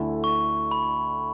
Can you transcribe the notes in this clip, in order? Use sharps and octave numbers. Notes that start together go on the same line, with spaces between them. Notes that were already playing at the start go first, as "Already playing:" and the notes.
Already playing: D2 D3 A3 E4
C#6
B5